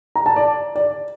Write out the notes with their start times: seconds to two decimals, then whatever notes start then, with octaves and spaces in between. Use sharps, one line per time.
0.16 A#5
0.26 A5
0.36 D5
0.76 D5